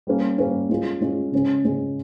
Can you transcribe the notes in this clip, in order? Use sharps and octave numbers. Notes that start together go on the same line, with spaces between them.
G3 A#3 C#4
G3 A#3 C#4
G#3 C#4 F4 G#4
G#3 C#4 F4 G#4
C#3 G#3 C#4 G#4
C#3 G#3 C#4 G#4